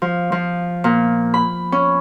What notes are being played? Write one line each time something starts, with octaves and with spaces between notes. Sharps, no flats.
F3
F3
A#2
B5
C#4